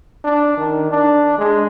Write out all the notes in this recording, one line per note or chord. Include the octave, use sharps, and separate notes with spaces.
D4
D#3
D4
G#3